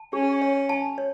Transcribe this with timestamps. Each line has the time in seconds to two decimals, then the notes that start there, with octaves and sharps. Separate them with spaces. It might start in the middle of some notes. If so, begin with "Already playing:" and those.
Already playing: A5
0.13 C#4 G#4
0.42 C#5
0.69 A5
0.98 C#5